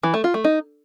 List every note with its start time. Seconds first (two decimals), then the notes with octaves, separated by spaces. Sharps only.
0.03 E3
0.14 A3
0.24 F4
0.34 A3
0.44 D#4